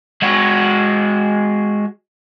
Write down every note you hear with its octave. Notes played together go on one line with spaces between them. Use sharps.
G#3 F#4